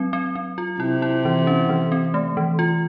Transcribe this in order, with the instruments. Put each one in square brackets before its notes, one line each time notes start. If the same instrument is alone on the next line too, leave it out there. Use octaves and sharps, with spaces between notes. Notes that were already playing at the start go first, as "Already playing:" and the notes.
Already playing: [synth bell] F#3 C4
C4
C4
F4
[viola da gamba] C3 [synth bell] E4
[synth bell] E4
E3
C#4
E3
C4
A3
E3
F4